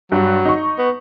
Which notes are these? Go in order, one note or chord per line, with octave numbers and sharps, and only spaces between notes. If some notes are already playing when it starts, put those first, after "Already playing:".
G2 F#3
D#4 C#6
B3